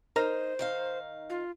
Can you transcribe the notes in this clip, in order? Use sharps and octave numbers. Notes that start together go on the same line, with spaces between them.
D#4 A#4 C5 A#5 F6
D#3 D#4 F5
F4